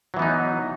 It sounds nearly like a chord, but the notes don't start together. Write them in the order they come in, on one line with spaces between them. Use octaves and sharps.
F#3 E3 B3 D#4